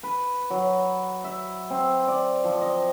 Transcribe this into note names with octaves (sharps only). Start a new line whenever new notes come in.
B4
F#3
E5
C4
D5
F3
D#5